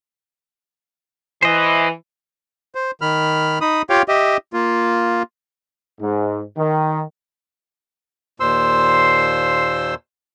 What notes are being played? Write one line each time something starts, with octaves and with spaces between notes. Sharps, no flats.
E3 C5 D#5
C5
D#3 B5 F6
D#4 B5 D#6
F4 G4 C#5 F5 G5
G4 D#5 E5
A#3 F4
G#2
D#3
D#2 A#2 C5 C6 E6